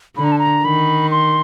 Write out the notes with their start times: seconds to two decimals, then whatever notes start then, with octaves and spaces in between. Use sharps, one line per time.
0.17 D3 B5
0.24 A#5
0.32 A5
0.39 A#5
0.64 D#3 B5
1.11 C6